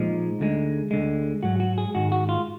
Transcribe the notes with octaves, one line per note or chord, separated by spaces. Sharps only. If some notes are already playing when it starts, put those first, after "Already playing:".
Already playing: A#2 F3 G#3 D#4
D2 D3 G#3
D2 D3 G#3
G#2 F#3 F#4
F#4
G#4
G#2 D#3 G#3 F#4
F#4
F4